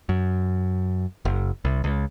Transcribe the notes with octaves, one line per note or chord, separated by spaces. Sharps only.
F#2
F#1
C2
C#2